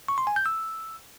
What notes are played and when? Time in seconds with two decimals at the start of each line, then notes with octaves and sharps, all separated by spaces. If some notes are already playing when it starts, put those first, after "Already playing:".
0.08 C#6
0.18 C6
0.27 G#5
0.36 G6
0.46 E6